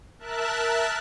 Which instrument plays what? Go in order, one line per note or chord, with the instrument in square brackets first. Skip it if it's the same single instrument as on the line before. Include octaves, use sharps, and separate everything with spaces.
[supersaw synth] A#4 E5 A5 F#6